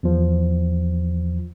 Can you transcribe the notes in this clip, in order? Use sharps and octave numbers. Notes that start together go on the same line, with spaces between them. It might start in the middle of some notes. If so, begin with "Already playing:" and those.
E2 F3